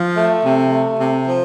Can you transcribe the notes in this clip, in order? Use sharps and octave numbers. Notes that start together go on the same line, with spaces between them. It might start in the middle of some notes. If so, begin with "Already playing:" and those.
Already playing: F3
A3
C3
A3
C3
F3